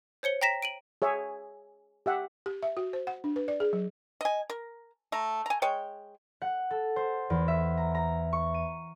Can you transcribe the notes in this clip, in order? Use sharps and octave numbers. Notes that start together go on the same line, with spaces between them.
C5 C#5 C#7 G7
G5 A#5 A#6 B6 E7
D7 D#7 F#7
G#4 C#5 E5
G4 E5 F#5
G4
E5
F#4
C5
F#5
D4
B4
D5
G#4
F#3
D#5 G#5
A#4
A3 A#5
G#5 A#5
G#3 C#5 G5
F#5
A4
C5
E2
E5
A#5
A#5
C#6
D#7